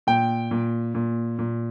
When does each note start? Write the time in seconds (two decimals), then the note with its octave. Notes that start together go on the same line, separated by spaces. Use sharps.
0.07 A#2 G5
0.51 A#2
0.95 A#2
1.39 A#2